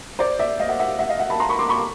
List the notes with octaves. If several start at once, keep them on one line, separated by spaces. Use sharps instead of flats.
C5 D5
D5 E5
D#5 F5
E5 F#5
E5 F#5
E5 F#5
D#5 F5
E5 F#5
A5 B5
A#5 C6
B5 C#6
C6 D6
B5 C#6